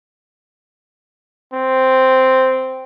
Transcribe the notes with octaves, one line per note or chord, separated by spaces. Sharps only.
C4